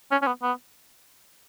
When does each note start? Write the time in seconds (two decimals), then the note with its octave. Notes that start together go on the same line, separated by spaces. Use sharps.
0.12 C#4
0.22 C#4
0.27 B3
0.43 B3